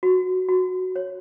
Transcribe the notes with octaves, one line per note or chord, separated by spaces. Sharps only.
F#4
F#4
C#5